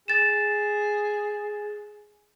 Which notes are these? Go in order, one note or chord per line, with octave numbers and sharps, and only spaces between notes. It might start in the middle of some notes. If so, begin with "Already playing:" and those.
G#4 A6 E7